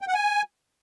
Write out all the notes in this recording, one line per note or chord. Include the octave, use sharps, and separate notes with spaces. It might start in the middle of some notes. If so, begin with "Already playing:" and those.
G5
F#5
G#5